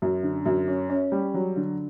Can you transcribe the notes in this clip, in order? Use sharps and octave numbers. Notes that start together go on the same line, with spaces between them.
F#2
D3
F#2
C#4
C#4
G3
F#3
D3